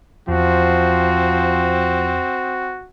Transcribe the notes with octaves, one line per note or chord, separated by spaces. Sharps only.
E2 F3 C4 F#4